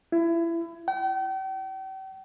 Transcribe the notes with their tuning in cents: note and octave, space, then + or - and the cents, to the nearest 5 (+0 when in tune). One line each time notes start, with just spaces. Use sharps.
E4 +25
G5 -40